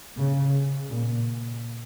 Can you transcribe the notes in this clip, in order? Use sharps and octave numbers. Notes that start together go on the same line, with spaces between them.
C#3
A#2